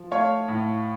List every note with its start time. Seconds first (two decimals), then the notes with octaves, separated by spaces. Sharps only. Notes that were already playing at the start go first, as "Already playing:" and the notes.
Already playing: F3
0.11 A3 C#5 F5
0.48 A2